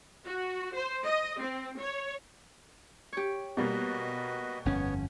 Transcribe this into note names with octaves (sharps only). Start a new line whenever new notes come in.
F#4
C5
D#5
C4
C#5
G4 C#5
B2 G3 A#3 F#4 B4 D#5
G1 F2 B3 C#4 C#5